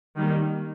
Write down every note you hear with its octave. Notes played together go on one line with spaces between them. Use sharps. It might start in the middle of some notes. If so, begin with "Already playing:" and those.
D#3 G3 A#3